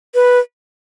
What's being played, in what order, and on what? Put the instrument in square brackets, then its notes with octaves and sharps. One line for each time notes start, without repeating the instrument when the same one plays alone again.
[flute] B4